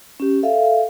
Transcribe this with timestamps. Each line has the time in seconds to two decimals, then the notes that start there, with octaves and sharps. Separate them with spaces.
0.20 C#4 G4
0.43 A4 E5 F5